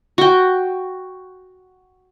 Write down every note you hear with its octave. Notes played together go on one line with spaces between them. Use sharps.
F#4 G5